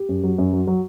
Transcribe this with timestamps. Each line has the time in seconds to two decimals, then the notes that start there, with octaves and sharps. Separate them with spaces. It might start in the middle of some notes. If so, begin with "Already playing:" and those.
Already playing: G4
0.09 F#2
0.24 F#3
0.38 F#2
0.53 F#3
0.67 F#3